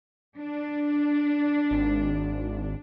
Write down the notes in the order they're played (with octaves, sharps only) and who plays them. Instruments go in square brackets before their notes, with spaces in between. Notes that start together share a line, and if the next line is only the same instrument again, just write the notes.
[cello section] D4
[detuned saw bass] G#1